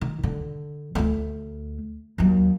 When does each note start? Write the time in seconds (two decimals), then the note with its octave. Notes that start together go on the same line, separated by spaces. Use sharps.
0.01 D#3
0.23 D3
0.95 D2 A3
2.18 D#2 F#3